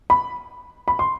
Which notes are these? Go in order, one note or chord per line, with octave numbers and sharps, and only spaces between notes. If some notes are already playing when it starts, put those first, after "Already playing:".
B5
B5
C6